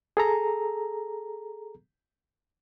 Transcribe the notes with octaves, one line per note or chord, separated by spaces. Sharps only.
G#4 A4 A#5